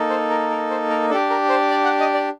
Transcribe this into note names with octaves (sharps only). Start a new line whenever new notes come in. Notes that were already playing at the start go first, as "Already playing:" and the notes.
Already playing: A#3 D#4 A4
C5
A#4
A#4
C5
A#4
D4 G4 A4
A#4
C5
D5
F#5
D#5
D5